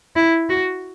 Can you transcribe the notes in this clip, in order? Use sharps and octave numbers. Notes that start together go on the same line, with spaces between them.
E4
F#4